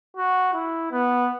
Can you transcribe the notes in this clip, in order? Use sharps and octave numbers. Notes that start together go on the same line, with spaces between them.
F#4
E4
B3